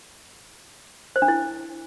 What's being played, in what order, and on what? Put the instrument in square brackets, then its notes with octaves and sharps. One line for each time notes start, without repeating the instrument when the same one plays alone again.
[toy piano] C5
D4
E4